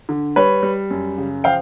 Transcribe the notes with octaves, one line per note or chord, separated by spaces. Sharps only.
D3
G3 B4 C#5
G3
F#2
C#3
F3 F5 G5